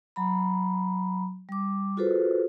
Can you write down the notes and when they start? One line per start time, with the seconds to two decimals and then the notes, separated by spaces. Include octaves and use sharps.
0.16 F#3 A#5 B5
1.49 G3 D6
1.97 F4 F#4 G#4 A4 B4 C5